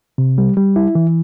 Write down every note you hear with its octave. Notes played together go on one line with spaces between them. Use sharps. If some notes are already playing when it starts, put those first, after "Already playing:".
C3
G3
G3
E4
E3